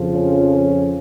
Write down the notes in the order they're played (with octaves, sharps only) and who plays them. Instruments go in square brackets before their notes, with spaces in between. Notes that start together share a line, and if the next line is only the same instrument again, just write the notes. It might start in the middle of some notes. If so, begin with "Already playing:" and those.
Already playing: [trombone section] F2 C#3 F3
C#4